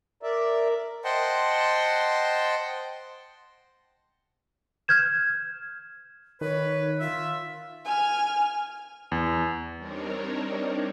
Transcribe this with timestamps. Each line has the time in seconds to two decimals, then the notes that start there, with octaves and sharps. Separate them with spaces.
0.23 A#4 D5 E5
1.04 C5 D#5 F#5 G5 A5 C6
4.88 F6 G6 G#6 E7
6.41 D#3 B4 C#5
7.00 F4 E5
7.85 G#5 F6
9.12 E2
9.78 G3 C4 D4 D#4 A#4 C#5